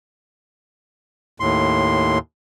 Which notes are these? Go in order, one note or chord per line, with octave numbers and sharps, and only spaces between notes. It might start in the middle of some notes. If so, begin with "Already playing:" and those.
D#2 A2 C6